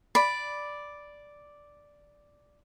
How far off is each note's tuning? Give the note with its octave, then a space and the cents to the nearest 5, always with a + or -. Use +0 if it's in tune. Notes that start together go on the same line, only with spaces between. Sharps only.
D5 +0 B5 +0